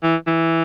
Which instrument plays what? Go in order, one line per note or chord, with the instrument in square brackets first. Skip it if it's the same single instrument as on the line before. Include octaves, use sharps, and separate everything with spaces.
[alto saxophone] E3
E3